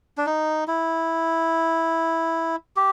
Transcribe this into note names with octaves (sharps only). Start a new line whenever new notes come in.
D4
D#4
E4
G4